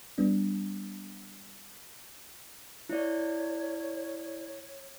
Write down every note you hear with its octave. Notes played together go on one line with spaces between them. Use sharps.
G3 B3 D4
E4 C#5 D5